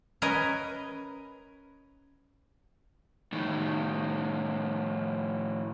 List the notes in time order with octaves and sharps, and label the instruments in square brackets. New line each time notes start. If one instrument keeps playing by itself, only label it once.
[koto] C#4 A#4 B4 D#5 G#5 A#5
[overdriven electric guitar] A2 D#3